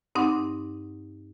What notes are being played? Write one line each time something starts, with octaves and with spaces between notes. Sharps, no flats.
G2 C4 D#4 F#5 D6 D#6